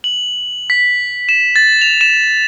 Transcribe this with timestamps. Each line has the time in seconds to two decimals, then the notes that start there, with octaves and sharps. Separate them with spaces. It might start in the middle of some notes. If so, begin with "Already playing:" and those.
0.04 F#7
0.70 B6
1.29 E7
1.56 A6
1.82 F7
2.01 E7